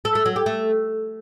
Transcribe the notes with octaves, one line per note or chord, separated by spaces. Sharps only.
A4
A3
F#3
G4
A3